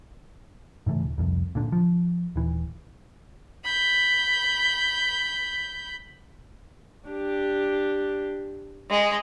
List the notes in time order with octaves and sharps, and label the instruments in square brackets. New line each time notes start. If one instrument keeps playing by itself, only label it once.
[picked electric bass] G#2 C#3 E3 A3
D#1
F1 C2 F2
A#2 D3
F3
D#1 E3
[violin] B5 G6
[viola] D4 G4
[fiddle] G#3 [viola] D#5